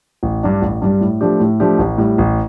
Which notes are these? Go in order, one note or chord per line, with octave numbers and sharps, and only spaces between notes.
A1
G2 G3 D4
A1
G2 G3 D4
A2
F3 A3 D4 G4
A2
F3 A3 D4 G4
A1
A2 G3
A1